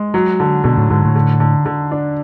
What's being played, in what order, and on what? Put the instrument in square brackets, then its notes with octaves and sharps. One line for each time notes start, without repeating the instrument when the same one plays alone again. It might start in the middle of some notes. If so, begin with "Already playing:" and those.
Already playing: [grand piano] G#3
F#3
D3
[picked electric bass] B2 [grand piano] D3
[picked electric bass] A2
[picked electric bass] G#2 [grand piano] D3
[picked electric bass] A2
[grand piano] D3
D3
D3
D4